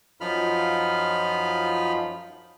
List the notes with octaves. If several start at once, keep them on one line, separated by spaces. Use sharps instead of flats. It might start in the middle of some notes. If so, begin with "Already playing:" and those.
F#2 F3 D#4 F4 B5 F6